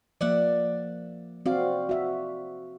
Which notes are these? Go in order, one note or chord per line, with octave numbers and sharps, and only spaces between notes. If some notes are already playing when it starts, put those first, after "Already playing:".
F3 A#3 D5 E5 F#5
C4 F#4 D5 F5
F#4 E5